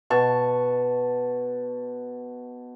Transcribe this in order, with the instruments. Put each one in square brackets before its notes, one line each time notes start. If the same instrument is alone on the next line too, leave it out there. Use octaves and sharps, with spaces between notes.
[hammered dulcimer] B2 A5 C#6